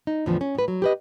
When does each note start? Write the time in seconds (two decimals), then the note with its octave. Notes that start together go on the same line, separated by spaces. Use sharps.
0.07 D#4
0.26 E2 A2 D3 E3 F3
0.41 C#4
0.55 A2 B4
0.68 F#3
0.82 G4 B4 D#5